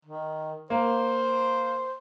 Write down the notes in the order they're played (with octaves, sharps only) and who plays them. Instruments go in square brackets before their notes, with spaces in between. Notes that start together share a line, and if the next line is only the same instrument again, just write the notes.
[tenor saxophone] D#3
[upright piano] A#3 [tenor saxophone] C5